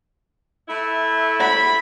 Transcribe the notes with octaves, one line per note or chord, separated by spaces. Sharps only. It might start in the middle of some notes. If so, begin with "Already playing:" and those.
A3 E4
B5